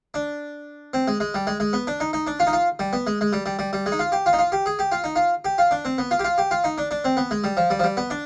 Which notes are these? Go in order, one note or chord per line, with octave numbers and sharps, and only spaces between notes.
D4
C4
G#3
G#3
G3
G#3
G#3
B3
D4
D#4
D#4
D4
F4
D#4
F4
G3
B3
G#3
G#3
G3
G3
G3
G3
G#3
D#4
F4
G4
F4
D#4
F4
G4
G#4
G4
F4
D#4
F4
G4
F4
D4
C4
B3
F4
G4
F4
G4
F4
D#4
D4
D4
C4
B3
G#3
G3
F3
G3
F3
G3
B3
D4